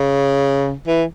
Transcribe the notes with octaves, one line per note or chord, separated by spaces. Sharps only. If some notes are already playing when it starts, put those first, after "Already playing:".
Already playing: C#3
E3